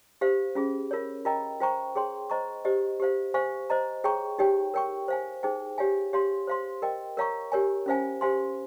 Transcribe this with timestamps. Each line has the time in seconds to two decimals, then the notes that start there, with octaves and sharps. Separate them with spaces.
0.21 G4 C5 F5
0.55 C#4 F4 G#4
0.91 F4 A#4 C#5
1.25 F4 A#4 D#5 G5 A#5
1.61 F4 C5 G5 A#5 C#6
1.96 G#4 C#5 G5 C6
2.30 C5 D#5 A#5 C#6
2.65 G4 C5 D#5
3.00 G4 C5 F5
3.34 C5 F5 G#5 C#6
3.70 C5 D#5 A#5
4.04 G#4 C#5 G5 A#5 C#6
4.39 D#4 G4 C#5 G5
4.74 A#4 C#5 G5 C#6
5.08 C5 F5 G#5
5.43 D#4 G#4 C5 G5
5.78 G4 C#5 F5 G#5
6.13 G4 C#5 F5 C6
6.47 C5 F5 C6
6.82 A#4 D#5 G5
7.17 A#4 C#5 F5 A#5 C#6
7.52 G4 A#4 C#5 G#5
7.86 C#4 F4 C5 F5 G#5
8.21 G4 C5 F5 G#5 C6